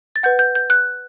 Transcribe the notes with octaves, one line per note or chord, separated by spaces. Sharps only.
A6
B4 F#5 G6
G6
G6
F#6